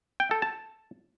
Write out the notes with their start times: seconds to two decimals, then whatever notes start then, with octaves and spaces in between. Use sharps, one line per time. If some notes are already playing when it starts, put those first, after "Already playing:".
0.20 G5
0.31 A4
0.42 A5